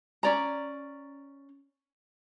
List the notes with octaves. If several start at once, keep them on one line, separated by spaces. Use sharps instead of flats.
C#4 D5 A#5